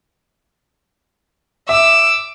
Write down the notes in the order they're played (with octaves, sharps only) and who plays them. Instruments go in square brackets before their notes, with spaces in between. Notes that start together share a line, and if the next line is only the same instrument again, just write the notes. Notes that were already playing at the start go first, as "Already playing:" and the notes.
[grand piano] E5 [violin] D6 E6